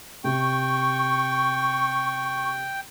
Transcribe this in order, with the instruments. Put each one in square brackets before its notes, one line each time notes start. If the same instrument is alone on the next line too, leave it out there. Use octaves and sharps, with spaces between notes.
[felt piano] C3 [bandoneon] G5 [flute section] C#6